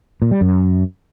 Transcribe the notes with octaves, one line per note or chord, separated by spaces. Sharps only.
A#2
G3
F#2